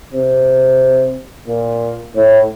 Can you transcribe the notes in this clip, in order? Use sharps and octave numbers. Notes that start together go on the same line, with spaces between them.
C3
A#2
A2